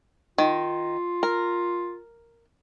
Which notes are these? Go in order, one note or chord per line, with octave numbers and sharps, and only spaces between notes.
D#3 F4
A#4